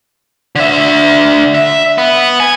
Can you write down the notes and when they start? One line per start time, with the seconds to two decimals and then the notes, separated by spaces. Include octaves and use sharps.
0.56 D3 E5
1.55 E5
1.98 B3
2.40 G#5